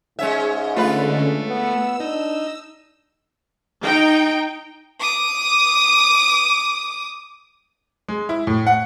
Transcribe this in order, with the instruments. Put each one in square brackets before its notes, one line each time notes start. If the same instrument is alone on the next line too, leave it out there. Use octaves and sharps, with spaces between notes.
[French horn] G#2 [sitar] G#3 C#4 E5
[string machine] D3 G#3 C#4 [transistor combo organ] A3 [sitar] F4 B4
[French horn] B3 [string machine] E6
[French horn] D4 [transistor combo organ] D#4
[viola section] D#4 G5
[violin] D6 D#6
[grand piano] G#3
E4
A2
F#5